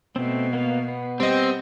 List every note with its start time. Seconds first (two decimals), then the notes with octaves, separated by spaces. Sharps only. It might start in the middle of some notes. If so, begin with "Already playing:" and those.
0.16 B2 A3 C4
0.53 A#3 B3 F5
0.88 B3
1.20 G3 C4 D#5